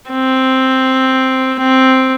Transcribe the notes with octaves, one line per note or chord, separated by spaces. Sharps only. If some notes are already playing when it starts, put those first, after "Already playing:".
C4
C4